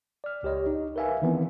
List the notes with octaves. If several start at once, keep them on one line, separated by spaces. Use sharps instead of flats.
D5 F6
C#2 G4 C#5 D#5
D#4
A#4 B4 E5 F5 G#5
D#3 E3 B3 C4